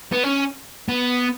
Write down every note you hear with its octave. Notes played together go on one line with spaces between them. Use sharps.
B3
C#4
B3